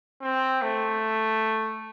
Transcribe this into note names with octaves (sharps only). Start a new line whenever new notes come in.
C4
A3